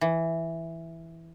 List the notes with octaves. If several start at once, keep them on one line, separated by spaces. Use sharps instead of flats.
E3